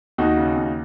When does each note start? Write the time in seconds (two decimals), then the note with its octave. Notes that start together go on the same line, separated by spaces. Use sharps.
0.18 D#2 D#4 F#4
0.37 C#3
0.56 D#2